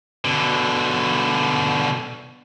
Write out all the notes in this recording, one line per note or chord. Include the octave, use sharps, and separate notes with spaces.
B2 D3